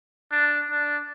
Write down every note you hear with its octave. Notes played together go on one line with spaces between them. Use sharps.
D4
D4